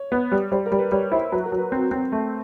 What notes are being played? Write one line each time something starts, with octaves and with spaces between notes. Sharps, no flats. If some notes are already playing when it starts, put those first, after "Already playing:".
Already playing: C#5
B3
G3
G3 C5
A#4
G3
B4
G3 C#5
E4 C5
F#3 B4
A#4
F#3
B4
C4
C4
A3